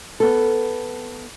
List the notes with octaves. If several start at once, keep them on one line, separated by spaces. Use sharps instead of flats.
B3 A4